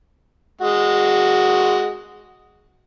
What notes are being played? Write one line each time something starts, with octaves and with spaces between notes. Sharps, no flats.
G#3 F#4